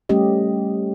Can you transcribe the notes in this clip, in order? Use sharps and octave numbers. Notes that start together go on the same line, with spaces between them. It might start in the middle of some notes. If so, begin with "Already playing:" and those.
G3 A3 C#4 G4 D#5